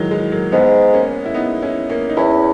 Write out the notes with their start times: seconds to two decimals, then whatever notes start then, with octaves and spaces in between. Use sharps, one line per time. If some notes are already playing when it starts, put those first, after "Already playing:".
Already playing: D#3 E3 F#3 G#3
0.11 E3 G#3
0.32 F#3 A#3
0.52 G#2 G#3 B3
0.94 A#3 C#4
1.26 E4
1.34 B3 D#4
1.62 C#4 E4
1.90 A#3 C#4
2.09 D#4
2.17 E2 C#4 E4